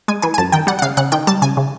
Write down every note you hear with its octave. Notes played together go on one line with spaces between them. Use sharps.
G#3 G#5
E3 G#5
G#5
F#2 A5
D#3 G5
G3 F#5
F#5
C#3 F5
C#3 F#5
D#3 G5
G3 A5
C#3 G#5
C#3